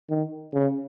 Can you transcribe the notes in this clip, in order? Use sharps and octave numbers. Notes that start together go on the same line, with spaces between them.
D#3
C#3